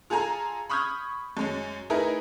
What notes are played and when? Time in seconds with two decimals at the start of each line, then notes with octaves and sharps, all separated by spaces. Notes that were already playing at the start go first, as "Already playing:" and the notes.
0.10 F4 G#4 A4 G#5 A#5
0.70 B5 C#6 D#6 F6 G6 G#6
1.37 F#2 G#3 C#4
1.90 A3 D#4 E4 G#4 A#4 B4